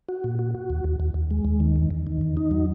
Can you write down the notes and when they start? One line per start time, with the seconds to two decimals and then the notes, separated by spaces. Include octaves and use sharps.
0.09 F#4
0.24 A#2
0.39 F#4
0.55 F#4
0.70 D#2
0.84 D#2
1.00 D#2
1.14 D#2
1.31 G#3
1.45 D#2
1.60 D#3
1.76 E2
1.90 E2
2.07 D#3
2.21 E2
2.37 D#4
2.51 F#3